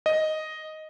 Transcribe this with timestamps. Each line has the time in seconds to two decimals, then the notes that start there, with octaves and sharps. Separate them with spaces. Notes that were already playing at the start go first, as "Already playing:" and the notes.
0.06 D#5